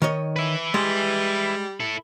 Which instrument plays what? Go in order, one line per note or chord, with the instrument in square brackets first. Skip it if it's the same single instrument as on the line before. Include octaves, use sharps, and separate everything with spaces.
[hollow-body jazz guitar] D#3 C#5 D#5
[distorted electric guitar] B4 E5
[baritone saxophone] G3 [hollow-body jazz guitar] G#3
[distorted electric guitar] E4 A4